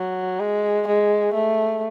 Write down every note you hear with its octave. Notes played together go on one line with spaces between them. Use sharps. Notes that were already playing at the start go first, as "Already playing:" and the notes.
Already playing: F#3
G#3
G#3
A3